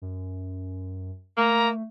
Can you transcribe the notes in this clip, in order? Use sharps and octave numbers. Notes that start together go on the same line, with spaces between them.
F#2
A3 A#3 A#5